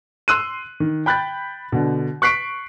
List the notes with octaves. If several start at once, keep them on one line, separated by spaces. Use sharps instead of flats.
C6 E6 F#6 D#7
D#3
G5 B5 F#6 G6 A6
B2 D3
C#6 F#6 B6 C7 D7